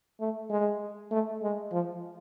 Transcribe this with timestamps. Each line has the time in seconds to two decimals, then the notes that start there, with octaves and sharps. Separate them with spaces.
0.20 A3
0.50 G#3
1.12 A3
1.42 G#3
1.72 F3